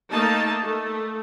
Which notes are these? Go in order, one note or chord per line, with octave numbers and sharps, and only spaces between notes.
A3 A#3 D#4 A5
A3